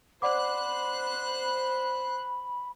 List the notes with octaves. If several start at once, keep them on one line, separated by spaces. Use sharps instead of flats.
C5 D5 F#5 B5 D6 F#6